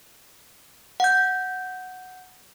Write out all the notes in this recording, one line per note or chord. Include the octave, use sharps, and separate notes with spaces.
F#5 G6